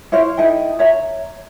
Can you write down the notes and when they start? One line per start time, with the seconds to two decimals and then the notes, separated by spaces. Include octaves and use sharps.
0.12 E4 C5 C#5 F5
0.37 D#4 E4 A4 G5
0.79 C#5 E5 A#5